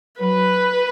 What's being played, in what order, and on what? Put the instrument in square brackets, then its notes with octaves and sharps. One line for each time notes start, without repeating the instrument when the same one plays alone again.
[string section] F#3 B4